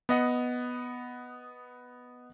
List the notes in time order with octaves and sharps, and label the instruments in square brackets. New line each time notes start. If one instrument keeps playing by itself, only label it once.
[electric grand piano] B3 D#5 F#5